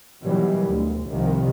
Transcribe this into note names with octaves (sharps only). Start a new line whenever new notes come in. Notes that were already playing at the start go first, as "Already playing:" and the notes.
B2 D#3 E3 F#3 G3
D2
C2 C3 D#3 F3 G3